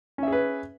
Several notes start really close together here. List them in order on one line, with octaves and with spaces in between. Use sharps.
C#4 E5 G#4 B4